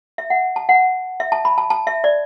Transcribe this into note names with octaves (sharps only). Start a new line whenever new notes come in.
E5
F#5
A5
F#5
E5
A5
B5
A5
A5
E5
D5